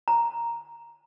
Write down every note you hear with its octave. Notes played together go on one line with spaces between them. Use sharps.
A#5